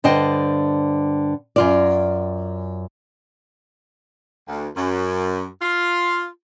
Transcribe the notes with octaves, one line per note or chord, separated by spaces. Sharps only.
G2 D3 C5 D#5 G5
F#2 F4 D5
D2
F#2
F4